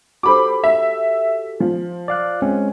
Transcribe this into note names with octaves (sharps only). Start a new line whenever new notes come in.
F#4 G4 A4 C5 B5 D6
E5
F3
D5 F5 F#6
G#3 C4 C#4